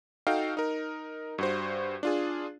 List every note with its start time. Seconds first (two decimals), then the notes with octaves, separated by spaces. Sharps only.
0.27 D#4 F#4 A4 F5 G5
0.57 D#4 A#4
1.38 G2 F#4 C5
2.03 D4 F4 G#4